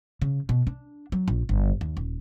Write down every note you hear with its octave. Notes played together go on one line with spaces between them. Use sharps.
C#3
B2
D4
F#3
A#1
G1
D#2
D#1